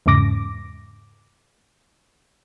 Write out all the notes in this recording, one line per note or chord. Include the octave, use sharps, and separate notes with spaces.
E2 G#2 C#3 D6 A#6